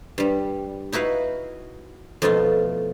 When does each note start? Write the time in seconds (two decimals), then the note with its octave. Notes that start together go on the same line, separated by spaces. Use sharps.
0.18 G2 G3
0.92 D#4 E4 F#4 B4 F5
2.22 F2 B2 A3 E4 F4 D#5